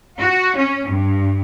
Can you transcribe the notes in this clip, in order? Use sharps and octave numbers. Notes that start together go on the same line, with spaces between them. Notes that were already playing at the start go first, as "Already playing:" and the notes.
F#4
C#4
G2